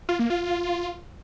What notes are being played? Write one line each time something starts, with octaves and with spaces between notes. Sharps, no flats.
F4
A#3
F4